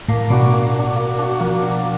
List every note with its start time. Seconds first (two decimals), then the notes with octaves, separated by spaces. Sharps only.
0.08 A2 A#3
0.30 B2 D4 F#4
0.52 A#3
0.75 D4 F#4
0.96 A#3
1.19 D4 F#4
1.40 F3 A#3
1.62 D4 F#4